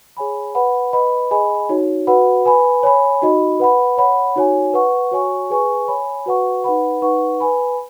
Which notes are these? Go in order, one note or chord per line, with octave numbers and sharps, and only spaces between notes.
G#4 C#5 G#5 B5
B4 F#5 B5
B4 D#5 B5
G#4 D#5 G#5 B5
D#4 F#4 C#5
F#4 B4 F#5 B5
B4 G#5 B5
C#5 G#5 B5
D#4 F#4 D#5 B5
B4 F#5 B5
C#5 F#5 B5
D#4 F#4 C#5 G#5
B4 F#5 C#6
F#4 C#5 G#5 C#6
G#4 B4 G#5 C#6
C#5 G#5 B5
F#4 B4 F#5 C#6
D#4 B4 F#5 B5
D#4 B4 F#5 C#6
B4 G#5 B5